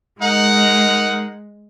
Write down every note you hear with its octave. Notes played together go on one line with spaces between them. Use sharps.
G#3 D#4 A#4 F#5